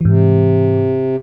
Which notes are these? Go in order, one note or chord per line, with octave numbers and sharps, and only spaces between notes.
G#2 C3 E3